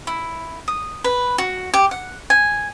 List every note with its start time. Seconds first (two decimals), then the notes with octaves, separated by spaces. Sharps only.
0.07 E4
0.68 D#6
1.04 B4
1.38 F#4
1.74 G4
1.91 F#5
2.30 G#5